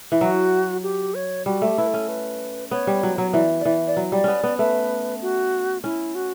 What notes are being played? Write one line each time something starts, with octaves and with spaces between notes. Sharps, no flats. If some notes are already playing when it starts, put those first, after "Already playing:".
E3
F#3 F#4
G4
C#5
G3 F#4
A3
G4
E4 B4
A4
C#4
B4
B3 C#5
G3
F#3
F#3
E3 D5
E3 D5
D5
F#3
G3 D5
B3 C#4
B3
A3 B4
F#4
C#4 E4
F#4